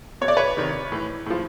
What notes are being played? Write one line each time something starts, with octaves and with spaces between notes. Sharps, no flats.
B2 C#5
D5
B4 C#5
C3 D#3
A2 E3
A2 F3